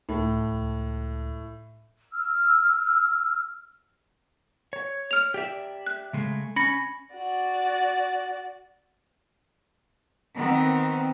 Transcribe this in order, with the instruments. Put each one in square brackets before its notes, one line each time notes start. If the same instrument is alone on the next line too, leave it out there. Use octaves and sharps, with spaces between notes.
[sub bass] C#2 [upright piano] A2
[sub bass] C#2
[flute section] E6 F6
[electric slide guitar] C#5
[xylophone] F6 F7
[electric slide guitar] G4 D5 E5
[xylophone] F#6
[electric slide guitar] C#3 G#3 A3
[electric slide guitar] C#4 [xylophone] B5 A#6 C#7
[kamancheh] F#4 D5
[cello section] D#3 B3 C4